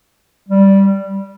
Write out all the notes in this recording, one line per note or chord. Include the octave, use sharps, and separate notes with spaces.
G3